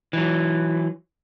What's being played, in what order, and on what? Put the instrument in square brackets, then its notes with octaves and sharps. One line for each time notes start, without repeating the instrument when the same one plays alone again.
[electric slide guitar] E3 F#3